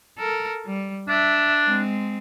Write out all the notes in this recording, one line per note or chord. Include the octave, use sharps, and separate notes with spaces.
A4 A#4
G3
D4 E5
G#3 C4